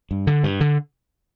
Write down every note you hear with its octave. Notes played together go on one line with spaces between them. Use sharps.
G2
D3
G2
D3